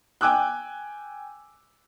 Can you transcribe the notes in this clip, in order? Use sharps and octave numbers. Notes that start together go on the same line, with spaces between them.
G5 G#5 D6 E6 F#6